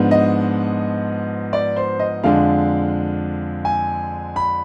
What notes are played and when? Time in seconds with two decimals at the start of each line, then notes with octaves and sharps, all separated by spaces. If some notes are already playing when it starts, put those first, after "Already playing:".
Already playing: G#2 F3 B3 D4
0.11 D#5
1.53 D5
1.76 C5
1.99 D#5
2.23 F2 D3 G#3 D4 F5
3.65 G#5
4.36 B5